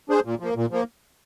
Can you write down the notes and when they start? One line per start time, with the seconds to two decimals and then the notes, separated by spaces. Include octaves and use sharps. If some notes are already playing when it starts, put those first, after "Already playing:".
0.09 D4 G#4 C5
0.25 A#2
0.40 F3 A#3
0.56 A#2
0.71 F3 A#3